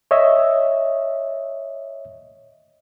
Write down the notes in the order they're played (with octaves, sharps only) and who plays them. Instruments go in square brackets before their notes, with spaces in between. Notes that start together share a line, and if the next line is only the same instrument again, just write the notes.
[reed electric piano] C#5 D#5 E5